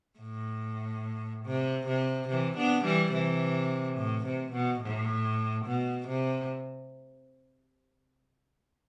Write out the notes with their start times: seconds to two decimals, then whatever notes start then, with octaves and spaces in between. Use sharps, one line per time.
0.19 A2
1.45 C3
1.87 C3
2.29 C3 E3
2.58 B3 D4
2.85 E3 G3
3.13 C3 E3
3.97 A2
4.26 C3
4.53 B2
4.81 A2
5.66 B2
6.08 C3